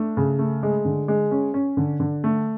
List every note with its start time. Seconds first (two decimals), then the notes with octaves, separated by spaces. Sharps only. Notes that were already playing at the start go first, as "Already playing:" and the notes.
Already playing: A3 D4
0.17 C#3
0.39 A3
0.63 G#3
0.85 D3
1.08 G#3
1.31 C#4
1.54 C#4
1.77 D3
2.00 D3
2.24 A3